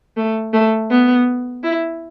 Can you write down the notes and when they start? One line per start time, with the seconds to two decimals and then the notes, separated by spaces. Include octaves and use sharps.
0.17 A3
0.53 A3
0.91 B3
1.63 E4